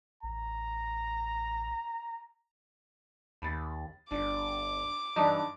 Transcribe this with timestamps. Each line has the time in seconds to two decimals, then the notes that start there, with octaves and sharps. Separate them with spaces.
0.23 A1 A#5
3.42 D#2 B5 A6
4.11 G1 D4 D6
5.16 G2 E3 D4 D#4